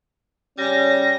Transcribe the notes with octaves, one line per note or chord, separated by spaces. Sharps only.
C#3 G3 C#4 A#6